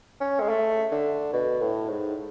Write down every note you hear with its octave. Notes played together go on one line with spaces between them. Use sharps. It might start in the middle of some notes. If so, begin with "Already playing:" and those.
C#4
G#3
A3
D3
B2
A2
G#2